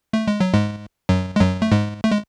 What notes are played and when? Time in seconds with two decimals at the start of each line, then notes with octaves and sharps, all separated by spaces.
0.13 A3
0.28 G#3
0.40 F#3
0.53 G#2 G#3
1.09 F#2 F#3
1.36 G#3
1.40 F#2 F#3
1.62 A3
1.72 G#2 G#3
2.04 A3
2.11 G#3